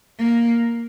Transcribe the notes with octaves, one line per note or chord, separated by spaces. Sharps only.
A#3